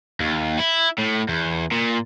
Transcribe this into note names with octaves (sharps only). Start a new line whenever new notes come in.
D#2
E4
A2
E2
A#2